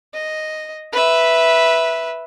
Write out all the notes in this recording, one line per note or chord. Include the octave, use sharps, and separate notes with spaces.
D#5
B4 E5